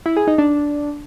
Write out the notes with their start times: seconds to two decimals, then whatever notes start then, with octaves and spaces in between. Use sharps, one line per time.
0.06 E4
0.17 G#4
0.27 D#4
0.38 D4